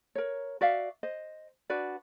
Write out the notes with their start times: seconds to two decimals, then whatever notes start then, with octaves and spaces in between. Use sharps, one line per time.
0.15 A#4 C#5
0.61 F#4 D5 E5 F5
1.03 C5 D#5
1.70 D4 F#4 B4 D5